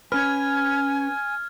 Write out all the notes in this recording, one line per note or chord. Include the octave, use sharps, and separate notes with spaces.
C#4 B4 G#5 F6 G#6